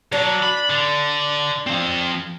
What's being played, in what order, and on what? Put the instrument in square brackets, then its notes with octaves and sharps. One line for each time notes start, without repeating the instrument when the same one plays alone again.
[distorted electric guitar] F#3 [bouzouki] D4
[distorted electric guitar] B5
D3
F3 C4